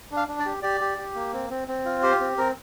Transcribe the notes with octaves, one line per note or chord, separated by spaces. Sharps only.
D4
F5
D4
D5
G4
G4 D5
G4
G4
A#3
C4
C4
C4
F4
G4 C5
C4
C4 A#4